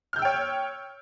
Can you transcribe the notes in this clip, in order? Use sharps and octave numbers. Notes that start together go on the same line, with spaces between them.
C#5 G5 E6 F6 G6